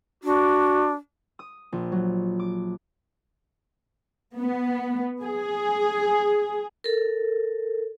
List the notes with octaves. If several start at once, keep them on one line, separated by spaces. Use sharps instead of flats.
D4 F#4
D#6
A#1
F#3
D6
B3
G#4
A4 A#4